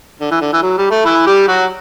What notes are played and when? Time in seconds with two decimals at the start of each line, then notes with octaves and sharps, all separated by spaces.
0.20 D3
0.31 E3
0.41 D3
0.53 E3
0.63 F#3
0.78 G3
0.91 A3
1.05 E3 E4
1.26 G3 G4
1.48 F#3 F#4